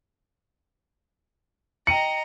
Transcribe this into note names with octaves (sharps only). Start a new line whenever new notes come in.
D#5 G5 A#5 C#7 D#7 F#7